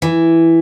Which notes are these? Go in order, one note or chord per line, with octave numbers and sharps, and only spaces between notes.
E3